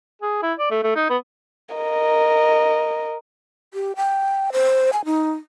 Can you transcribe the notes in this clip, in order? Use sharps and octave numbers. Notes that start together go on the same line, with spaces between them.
G#4
E4
D5
A3
A3
D#4
B3
A#4 D#5
G4
G5
C5
G#5
D#4